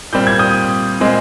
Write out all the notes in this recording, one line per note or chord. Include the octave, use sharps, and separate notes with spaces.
A#2 G3 C4 G6
G#6
D#6 G6
A#2 G#3 C4